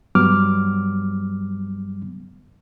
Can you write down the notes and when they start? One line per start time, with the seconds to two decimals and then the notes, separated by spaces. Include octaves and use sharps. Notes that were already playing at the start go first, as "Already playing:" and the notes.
0.15 G2 F#3 G3 B3 D6 F6